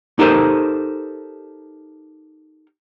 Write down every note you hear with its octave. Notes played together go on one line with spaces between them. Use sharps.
D#4 G4 A4 A#4 C5 D#5